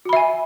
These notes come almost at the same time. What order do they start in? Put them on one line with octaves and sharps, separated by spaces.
F#4 B5 E5 G#5